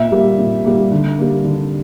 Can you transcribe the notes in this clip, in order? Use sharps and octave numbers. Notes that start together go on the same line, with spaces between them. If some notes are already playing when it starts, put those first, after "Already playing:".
Already playing: A#2 E5
G3 A#3
A#2
G3 A#3
D3
G3 A#3
D3